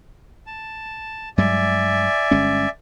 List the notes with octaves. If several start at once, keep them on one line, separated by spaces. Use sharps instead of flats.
A5
G2 F#3 G#3 D5 E5 G#5
G1 G#3 C#4